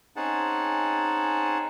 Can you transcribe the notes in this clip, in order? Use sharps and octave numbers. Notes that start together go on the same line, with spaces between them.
C4 C#4 D#4 G#4 F#5 A5